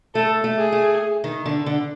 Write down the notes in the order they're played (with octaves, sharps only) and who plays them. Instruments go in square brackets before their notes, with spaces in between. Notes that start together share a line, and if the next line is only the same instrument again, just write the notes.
[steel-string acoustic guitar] A3 [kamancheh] A4
[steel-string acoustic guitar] A3
[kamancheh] G#4
[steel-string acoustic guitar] A3
D#3
D3
D3